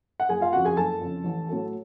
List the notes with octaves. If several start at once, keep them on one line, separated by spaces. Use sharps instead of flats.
F#5
F#1 G#4 G#5
F4 F5
F2 C#3 F#4 F#5
G#4 G#5
F#1 A4 A5
F2 C#3
A1
A2 F#3 A3